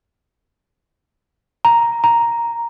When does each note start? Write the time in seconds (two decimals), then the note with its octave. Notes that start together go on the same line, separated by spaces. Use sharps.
1.65 A#5
2.04 A#5